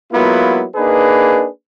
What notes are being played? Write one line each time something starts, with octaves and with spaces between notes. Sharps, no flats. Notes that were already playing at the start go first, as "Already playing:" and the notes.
F#3 G#3 A#3 B3 E4 F4
A#3 D4 D#4 G#4 B4